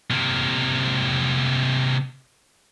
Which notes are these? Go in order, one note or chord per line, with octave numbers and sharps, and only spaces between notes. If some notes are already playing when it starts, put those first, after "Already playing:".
C3 A#3